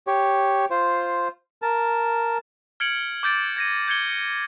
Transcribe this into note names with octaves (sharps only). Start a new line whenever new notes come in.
G4 C#5
F4 C5
A#4 A5
F6 G#6 C#7 D7 F#7
D6 G6 A6 D7
G#6 A#6 D#7
G6 G#6 C#7 G7
C#7